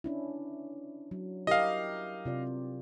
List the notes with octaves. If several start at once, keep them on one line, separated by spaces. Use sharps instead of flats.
C#4 D4 E4
F#3
E4 G4 A#4 D#5 F5
C3 F4 D5